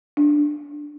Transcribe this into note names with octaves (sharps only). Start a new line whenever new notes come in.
D4